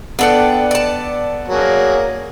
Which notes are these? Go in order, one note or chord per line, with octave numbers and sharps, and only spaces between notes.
B3 D4 A4 D5 F#5 G5
D5 A5
F#3 A#3 G#4